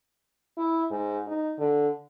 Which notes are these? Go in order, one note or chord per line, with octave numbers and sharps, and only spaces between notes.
E4
G#2
D#4
D3